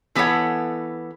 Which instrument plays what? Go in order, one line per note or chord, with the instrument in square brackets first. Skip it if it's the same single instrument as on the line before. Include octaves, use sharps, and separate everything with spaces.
[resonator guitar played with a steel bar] E3 B3 G#4 A4 C#5 F#5